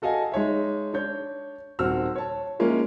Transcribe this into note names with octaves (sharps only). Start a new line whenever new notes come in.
F#4 A4 D#5 F5 G#5
G#3 D#4 C#5 E5
D4 C#5 G6
D#1 C4 F#4 E6 F6
C#5 A5
F3 G#3 A#3 C#4 E4